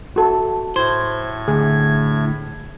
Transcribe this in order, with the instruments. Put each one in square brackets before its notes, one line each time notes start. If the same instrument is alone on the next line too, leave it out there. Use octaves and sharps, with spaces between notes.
[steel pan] F#4 A4
[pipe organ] A2 G#6 [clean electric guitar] C5
[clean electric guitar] D2 [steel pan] G#4